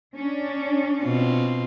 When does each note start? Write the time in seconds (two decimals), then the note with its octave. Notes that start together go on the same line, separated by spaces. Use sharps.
0.15 C#4 D4
1.02 B2 C4 F4